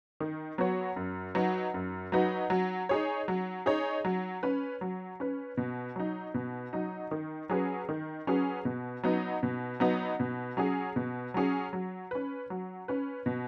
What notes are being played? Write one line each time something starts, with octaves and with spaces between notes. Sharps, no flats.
D#3
F#3 B3 F#4 C#5
F#2
F#3 D#4 F#4 B4
F#2
F#3 D#4 F#4 B4
F#3
D#4 G#4 C#5
F#3
D#4 G#4 C#5
F#3
C#4 B4
F#3
C#4 B4
B2
F#3 D#4
B2
F#3 D#4
D#3
F#3 C#4 G#4 B4
D#3
F#3 C#4 G#4 B4
B2
F#3 B3 D#4
B2
F#3 B3 D#4
B2
F#3 C#4 G#4
B2
F#3 C#4 G#4
F#3
C#4 B4
F#3
C#4 B4
B2